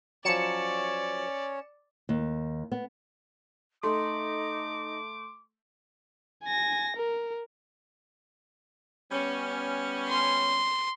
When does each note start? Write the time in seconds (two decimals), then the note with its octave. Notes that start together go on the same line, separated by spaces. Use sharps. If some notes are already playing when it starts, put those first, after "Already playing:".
0.25 F3 F#3 C#4 C#5 D5 C#7 E7
2.09 D#2
2.72 B3
3.83 A3 D#4 C6 D6
6.44 G#5 A#6
6.96 A#4
9.12 G3 B3 C#4
10.08 C6